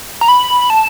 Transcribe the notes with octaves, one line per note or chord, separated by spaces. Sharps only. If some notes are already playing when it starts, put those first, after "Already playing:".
A#5
B5
A5